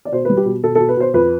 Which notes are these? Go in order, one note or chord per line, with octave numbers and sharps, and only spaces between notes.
D5
B2 C5
G3 B4
G4
B2
B2 A4
B2 A4
B4
B2 C5
F2 B4